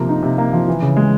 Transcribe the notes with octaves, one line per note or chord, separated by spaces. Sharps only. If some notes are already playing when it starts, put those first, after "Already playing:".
Already playing: C3 F3 A#3
D#4
C3
A#3
F3
E3
C#3
G#3